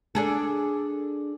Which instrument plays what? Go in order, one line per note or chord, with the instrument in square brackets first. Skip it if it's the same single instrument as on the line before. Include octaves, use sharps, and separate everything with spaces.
[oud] D4 G#4 A4